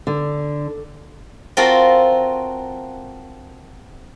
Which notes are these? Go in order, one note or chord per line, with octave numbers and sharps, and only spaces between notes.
D3
C4 F4 F#4 A4 A#4